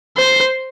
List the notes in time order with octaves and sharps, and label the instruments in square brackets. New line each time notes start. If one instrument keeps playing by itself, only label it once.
[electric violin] C5